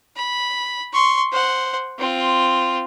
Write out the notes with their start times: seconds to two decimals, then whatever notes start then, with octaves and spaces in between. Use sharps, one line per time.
0.16 B5
0.93 C6 C#6
1.32 C5 F#5
1.99 C4 F4